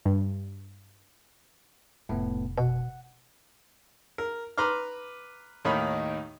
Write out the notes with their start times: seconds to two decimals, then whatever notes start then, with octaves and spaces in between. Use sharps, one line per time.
0.06 G2
2.09 F1 A2 A3 B3
2.58 B2 F#5
4.18 A#4
4.58 B4 A#5 C6 D6 F6
5.65 D#2 A2 D#3 D#4 B5